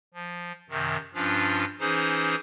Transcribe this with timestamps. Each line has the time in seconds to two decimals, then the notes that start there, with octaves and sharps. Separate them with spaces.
0.14 F3
0.70 F#2 C3 D#3
1.14 G2 F3 C#4 D4 F4
1.80 E3 C#4 D#4 G#4 C5